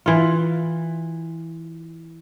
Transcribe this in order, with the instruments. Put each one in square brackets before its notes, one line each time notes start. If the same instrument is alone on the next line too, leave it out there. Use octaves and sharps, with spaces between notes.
[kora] E3 F4